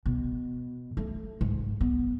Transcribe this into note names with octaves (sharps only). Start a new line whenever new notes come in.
B2
A3
G#2
B3